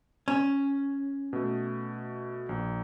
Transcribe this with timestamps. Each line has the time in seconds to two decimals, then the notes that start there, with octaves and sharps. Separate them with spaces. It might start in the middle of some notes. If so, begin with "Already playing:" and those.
0.28 C#4
1.33 B2 A3
2.49 A#1